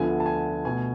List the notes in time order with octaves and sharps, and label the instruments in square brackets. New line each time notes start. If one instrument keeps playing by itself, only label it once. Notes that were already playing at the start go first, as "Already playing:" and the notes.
Already playing: [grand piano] D2 D3 F3 B3 G#5
A5
G#5
B2 A3 G#5